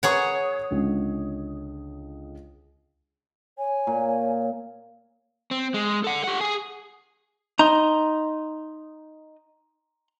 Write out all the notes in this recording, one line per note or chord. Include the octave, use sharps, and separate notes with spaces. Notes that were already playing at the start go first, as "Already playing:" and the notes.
G#4 B4 C#5 F#5 A#5 C#6
C#2 D3
C#5 G#5
A#2
C4
G#3
A4 F#5
G4 F#5
G#4 G#5
D#4 A#5 C6